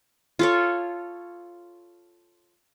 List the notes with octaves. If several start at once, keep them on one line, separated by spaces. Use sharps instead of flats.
F4 A4 C#5